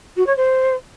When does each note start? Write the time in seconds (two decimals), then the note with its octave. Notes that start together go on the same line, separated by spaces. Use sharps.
0.16 F#4
0.26 C#5
0.36 C5